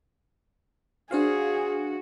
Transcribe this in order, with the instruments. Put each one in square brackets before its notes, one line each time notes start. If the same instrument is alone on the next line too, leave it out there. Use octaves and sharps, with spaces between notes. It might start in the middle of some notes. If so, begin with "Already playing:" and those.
[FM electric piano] D4 C5 F5 [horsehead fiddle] F#4 [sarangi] G#4